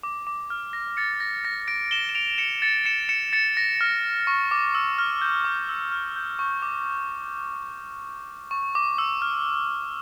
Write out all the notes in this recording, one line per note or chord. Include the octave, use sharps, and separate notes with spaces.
D6
D6
F6
A#6
A6 C#7
A#6
A#6
A#6 D7
E7 G7
E7
D7 F7
C#7 E7
A6 C#7
C#7 E7
C#7 E7
A6 C#7
A#6
F6
C#6
D6
E6
F6
G6
D6
E6
F6
G6
C#6
D6
C#6
D6
E6
F6